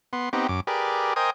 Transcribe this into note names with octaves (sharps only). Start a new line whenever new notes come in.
B3 C6
B3 C4 D#4 G4
F#2 D6
G4 G#4 A#4 B4 D5
A#4 C5 D#5 G5 G#5 D#6